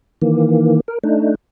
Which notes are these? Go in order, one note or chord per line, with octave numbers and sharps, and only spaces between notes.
D#3 E3 A#3
A#4
A3 D4 D#4